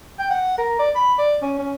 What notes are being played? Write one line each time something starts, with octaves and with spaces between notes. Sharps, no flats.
G5
F#5
A#4
D5
B5
D5
C#4
C#4